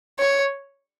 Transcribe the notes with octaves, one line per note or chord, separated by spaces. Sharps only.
C#5